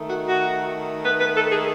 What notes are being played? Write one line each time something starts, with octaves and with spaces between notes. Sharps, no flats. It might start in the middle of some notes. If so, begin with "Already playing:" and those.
Already playing: D#3 A3
F#4
F#4
B4
B4
A4
G#4